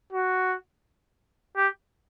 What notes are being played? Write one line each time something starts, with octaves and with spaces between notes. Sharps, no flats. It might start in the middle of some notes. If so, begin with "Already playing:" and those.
F#4
G4